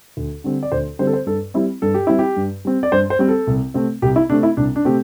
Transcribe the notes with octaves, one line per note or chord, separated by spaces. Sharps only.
D2
D3 G3 C4
D5
D2 C5
D3 G3 C4 C5
A4
C5
G2 A4
G3 C4 E4
G2 A4
G4
G3 C4 E4
G4
G2
G3 C4
D5
G2 C5
C5
G3 C4
A4
C2
C3 A3 C4
C2 G4
E4
C3 A3 C4 D4
E4
C2 D4
D4
C3 A3 C4 G4